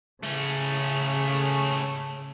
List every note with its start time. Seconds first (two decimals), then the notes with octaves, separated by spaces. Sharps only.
0.23 C#3 A3 C#4